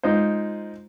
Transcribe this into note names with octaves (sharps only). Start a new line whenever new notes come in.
G#3 D#4 F4 C5